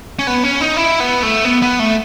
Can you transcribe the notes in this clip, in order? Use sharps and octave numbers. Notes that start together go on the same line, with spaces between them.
C#4
B3
C#4
D#4
E4
B3
A3
B3
B3
A3